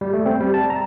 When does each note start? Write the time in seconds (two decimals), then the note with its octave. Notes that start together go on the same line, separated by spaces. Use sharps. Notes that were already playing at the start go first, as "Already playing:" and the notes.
0.01 G3
0.14 A3
0.26 C4
0.41 G3
0.54 A5
0.70 A#5